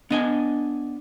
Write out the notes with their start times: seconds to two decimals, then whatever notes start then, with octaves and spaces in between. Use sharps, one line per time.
0.10 B3 D4 D#5 G#5